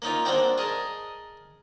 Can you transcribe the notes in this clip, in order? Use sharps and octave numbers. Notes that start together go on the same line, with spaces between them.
A#3 C#4 D#4 F4
A#3 C4 D4 F#4 C5 G5
G#4 A#4 D#5 A5